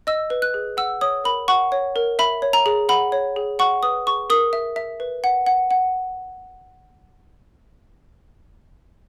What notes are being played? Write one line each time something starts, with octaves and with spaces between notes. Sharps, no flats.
D#5 E6
B4
F#6
G#4
F#5 E6
C#5 D#6
A#4 B5
F#5 C#6
C#5
A#4
E5 B5
C#5
A#5
G#4
F#5 B5
C#5
G#4
F#5 C#6
B4 D#6
G#4 C#6
A#4 D#6
E5
E5
B4
F#5
F#5
F#5